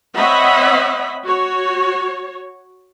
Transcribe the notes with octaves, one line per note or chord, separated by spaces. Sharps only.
C4 C#5 D#5 E5 F#5 B5
F#4 C#5